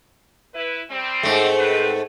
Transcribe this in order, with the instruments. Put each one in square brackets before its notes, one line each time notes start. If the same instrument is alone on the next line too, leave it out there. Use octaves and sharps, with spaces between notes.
[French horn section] E4 B4
G3 C4
[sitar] G#2 A3
[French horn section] C4 B4 C5